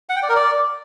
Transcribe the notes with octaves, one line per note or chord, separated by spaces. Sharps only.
F#5
G5
D5
A#4
D5